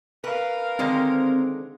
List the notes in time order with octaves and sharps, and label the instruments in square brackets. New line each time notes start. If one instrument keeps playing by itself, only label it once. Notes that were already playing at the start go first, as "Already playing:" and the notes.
[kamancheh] A#4 F5 [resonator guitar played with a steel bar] B4
[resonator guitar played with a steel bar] D3 D#3 G#3 [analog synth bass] C4